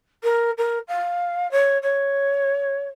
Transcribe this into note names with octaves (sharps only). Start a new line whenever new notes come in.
A#4
A#4
F5
C#5
C#5